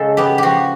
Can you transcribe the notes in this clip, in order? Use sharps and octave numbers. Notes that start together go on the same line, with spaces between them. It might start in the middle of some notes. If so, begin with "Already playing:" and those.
Already playing: C#3 G#3 A4
B3 G4
F3 F#4 G4